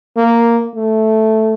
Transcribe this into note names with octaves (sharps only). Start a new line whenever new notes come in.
A#3
A3